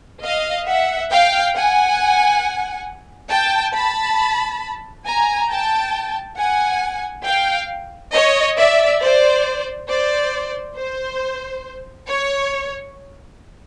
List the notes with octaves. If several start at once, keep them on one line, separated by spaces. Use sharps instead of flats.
D#5 F5
E5 F#5
F5 G5
F#5 G#5
G5 A5
A5 B5
G#5 A#5
G5 A5
F#5 G#5
F5 G5
C#5 D#5
D5 E5
C5 D5
C5 D5
C5
C#5